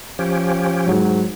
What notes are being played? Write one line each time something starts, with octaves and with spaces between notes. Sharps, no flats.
F3 C#4 G4
G#2 F#3